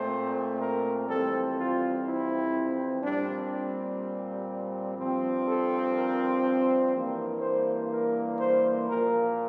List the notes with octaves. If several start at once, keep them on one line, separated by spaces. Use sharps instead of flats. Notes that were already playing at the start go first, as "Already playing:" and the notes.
Already playing: A#2 A3 C4 C5
A#4
F2 E3 G3 C4 A4
F4
E4
A#2 G3 C4 D4
G2 F3 C4
A4
A#4
C5
G2 E3 A#3
C5
A#4
C5
A#2 F3 A#3 A#4